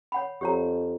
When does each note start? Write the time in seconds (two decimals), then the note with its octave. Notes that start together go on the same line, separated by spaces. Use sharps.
0.12 C#5 F#5 B5
0.41 F2 G4 C#5 A#5